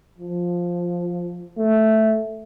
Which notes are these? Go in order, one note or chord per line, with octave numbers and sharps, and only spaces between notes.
F3
A3